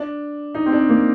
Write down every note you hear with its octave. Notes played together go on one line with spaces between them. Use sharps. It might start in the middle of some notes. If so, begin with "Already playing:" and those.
Already playing: D4
D#4
C4
D4
A#3